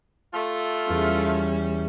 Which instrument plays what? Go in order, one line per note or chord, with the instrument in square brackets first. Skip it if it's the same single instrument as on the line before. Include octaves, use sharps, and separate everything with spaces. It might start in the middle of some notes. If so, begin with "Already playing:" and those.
[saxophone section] A3 F4
[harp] E2 [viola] G3 C#4